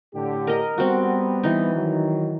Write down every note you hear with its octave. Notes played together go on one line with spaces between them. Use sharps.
A2 D3 G4
A#4 D#5
G3 B3 C4 F#4
E3 D#4
D#3 F#3